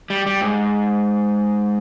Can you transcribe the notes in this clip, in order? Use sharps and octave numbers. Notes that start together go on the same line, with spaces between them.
G3
G3
G#2